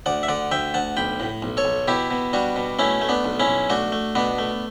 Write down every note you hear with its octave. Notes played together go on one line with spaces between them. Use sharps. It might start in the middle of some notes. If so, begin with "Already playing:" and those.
D2 D5 F#5
E5
D3 D5 F#5
D2 E5 G5
D2 F#5 A5
B1 G5 B5
A2
B1
A4 C#5
B1
B2 E4 G4
B2
G3 D4 F#4
B2
A3 C#4 E4
A3
B3 D4
B1
C#4 E4
B1
A3 D4 F#4
A3
B2 B3 D4
A3